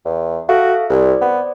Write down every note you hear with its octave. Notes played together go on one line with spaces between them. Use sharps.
E2
F#4 A4 E5 F5
C2 C5 D5
B3